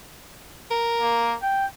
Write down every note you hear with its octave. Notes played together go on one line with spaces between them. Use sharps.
A#4
A#3
G5